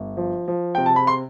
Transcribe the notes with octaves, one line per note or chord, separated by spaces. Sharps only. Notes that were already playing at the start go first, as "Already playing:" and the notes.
Already playing: G1
F3
F3
C3 G5
A5
B5
C6